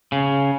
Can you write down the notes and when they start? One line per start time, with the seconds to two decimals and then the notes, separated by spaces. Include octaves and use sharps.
0.12 C#3